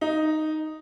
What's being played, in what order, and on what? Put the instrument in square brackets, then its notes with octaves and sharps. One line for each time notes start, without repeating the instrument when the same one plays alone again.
[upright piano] D#4